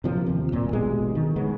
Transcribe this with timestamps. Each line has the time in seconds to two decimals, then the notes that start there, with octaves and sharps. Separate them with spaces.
0.04 C3 F3 F#3 A#3
0.26 D#2 C3
0.52 D1 A#2
0.73 A1 G2 B2 G#3
1.15 D#3
1.36 C#3 G#3 B3